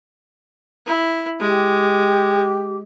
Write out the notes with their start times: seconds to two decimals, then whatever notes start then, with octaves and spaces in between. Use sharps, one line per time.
0.86 E4
1.40 G#3 G4